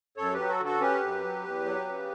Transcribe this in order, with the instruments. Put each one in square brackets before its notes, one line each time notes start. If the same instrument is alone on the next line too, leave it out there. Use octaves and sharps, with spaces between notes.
[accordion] F#2 A4 C#5
G4 B4
F#3
F#4 A4
D3
F#4 A4
C#4 G4 B4
F#2
F#3
E2
F#3
C#3